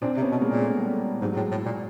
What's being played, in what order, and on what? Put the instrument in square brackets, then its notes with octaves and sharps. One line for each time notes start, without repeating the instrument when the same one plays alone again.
[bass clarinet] A#2 [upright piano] C4 D4
[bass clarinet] C3
[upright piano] B3 C#4
[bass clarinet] B2
[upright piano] G#3 A#3
[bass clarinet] A#2
[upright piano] A3
A#3
G3 A3
[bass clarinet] G#2 [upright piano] F#3 G#3
[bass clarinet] A2
A2
A#2